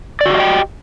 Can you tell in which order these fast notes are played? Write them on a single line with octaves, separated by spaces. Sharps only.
D5 F#4 G4 D#5 G5